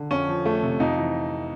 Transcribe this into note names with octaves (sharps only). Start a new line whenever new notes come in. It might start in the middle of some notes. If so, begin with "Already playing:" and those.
Already playing: D3
F2 C#4
F3
F2 A3
C3
F2 D#4
E3